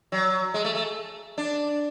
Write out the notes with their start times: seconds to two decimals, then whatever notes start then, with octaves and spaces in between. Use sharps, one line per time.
0.12 F#3
0.54 G#3
0.64 A3
0.75 A3
1.38 D4